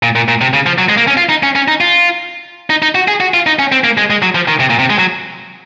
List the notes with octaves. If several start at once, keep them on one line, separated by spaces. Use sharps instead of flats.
A#2
A#2
A#2
C3
C#3
F3
F#3
G#3
A#3
C#4
F4
D#4
C#4
C#4
D#4
F4
D#4
D#4
F#4
G#4
F#4
F4
D#4
C#4
C4
A#3
G#3
G#3
F#3
F3
D#3
C3
A#2
C3
G#3
F#3